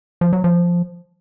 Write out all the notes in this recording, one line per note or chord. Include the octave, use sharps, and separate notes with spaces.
F3
F#3
F3